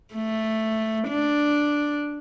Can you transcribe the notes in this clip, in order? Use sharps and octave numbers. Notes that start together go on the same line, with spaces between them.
A3
D4